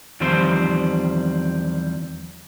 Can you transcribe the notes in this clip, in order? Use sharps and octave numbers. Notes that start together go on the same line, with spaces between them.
E2 D#3 F3 G3 C4 C5